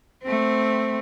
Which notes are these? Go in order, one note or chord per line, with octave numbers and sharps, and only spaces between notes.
A3 C4